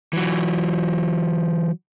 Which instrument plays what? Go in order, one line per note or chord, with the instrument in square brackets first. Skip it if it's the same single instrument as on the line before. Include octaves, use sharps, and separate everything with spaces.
[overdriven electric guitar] E3 F#3